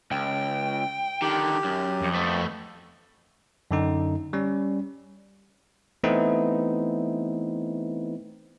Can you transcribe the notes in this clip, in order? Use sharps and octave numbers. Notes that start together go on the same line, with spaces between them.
C#2 G5
D3 D#3 G4
F#2
F2
A3 B3
F#2 D3 D#4
G3 C#4
E3 A3 B3 C4 D#4 E4